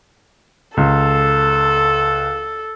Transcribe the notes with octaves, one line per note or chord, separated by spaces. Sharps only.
C#2 A4